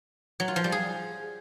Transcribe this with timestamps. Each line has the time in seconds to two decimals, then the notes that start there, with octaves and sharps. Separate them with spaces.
0.40 F#3
0.48 F4
0.56 F3
0.64 G3
0.72 G#4